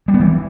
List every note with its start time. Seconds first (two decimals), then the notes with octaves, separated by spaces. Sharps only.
0.08 G3
0.14 B3
0.20 E3